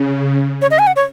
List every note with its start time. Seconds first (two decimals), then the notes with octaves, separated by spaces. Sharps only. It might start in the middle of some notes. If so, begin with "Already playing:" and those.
Already playing: C#3
0.62 C#5
0.71 D#5
0.79 G#5
0.87 F#5
0.96 C#5